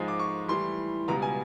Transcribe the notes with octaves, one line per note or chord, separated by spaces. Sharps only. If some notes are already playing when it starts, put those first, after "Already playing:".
Already playing: G#2 F3 G#3
D6
C#6
A2 E3 G3 C6
C#2 B2 G3 A#5
G#5